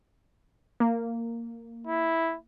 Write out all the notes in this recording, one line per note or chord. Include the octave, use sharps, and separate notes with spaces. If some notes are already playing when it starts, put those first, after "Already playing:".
A#3
E4